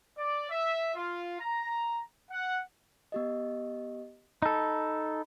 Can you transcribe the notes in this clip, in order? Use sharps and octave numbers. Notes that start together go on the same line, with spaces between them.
D5
E5
F4
A#5
F#5
B3 G4 D#5
D#4 A4 B5